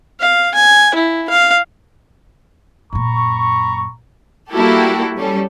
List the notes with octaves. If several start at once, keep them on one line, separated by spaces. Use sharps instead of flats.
F5
G#5
E4
F5
F#2 A#2 A#5 B5 C#6
G3 A#3 E4 F#4 G4 A4
G3 C#4 A4